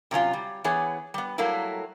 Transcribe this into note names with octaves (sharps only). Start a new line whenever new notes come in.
C3 F#3 C#4 F4
G3
E3 B3 G#4 C#5
G3 B3
F#3 G3 A3 A#3 E4